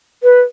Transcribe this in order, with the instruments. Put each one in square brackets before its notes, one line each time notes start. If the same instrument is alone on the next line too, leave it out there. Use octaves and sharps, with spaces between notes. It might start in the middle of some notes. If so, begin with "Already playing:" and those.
[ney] B4